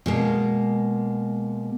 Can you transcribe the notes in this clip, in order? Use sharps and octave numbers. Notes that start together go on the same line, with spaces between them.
B2 G#3 A#3